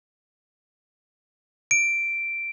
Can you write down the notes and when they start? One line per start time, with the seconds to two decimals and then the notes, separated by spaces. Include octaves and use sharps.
1.71 D7